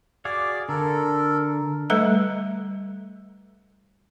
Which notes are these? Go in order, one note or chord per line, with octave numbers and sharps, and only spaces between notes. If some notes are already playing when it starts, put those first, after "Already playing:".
F#4 G#4 D5 F5 D6
D3 A4 A#4
G3 A3 A4 B4 E5 A#5